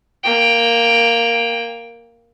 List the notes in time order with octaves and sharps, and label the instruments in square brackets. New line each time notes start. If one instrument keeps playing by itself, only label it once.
[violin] A#3 G5